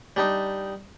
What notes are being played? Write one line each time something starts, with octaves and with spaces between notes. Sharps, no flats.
G3 D4 D#4